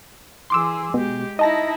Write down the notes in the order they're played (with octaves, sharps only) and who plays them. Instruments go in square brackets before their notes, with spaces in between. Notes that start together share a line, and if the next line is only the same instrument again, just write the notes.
[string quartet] E3 G#4 [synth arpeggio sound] C6 D6 E6
[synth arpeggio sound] B2 [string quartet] G#3 G4
[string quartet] D#4 E4 [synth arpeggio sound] D#5 A5 A#6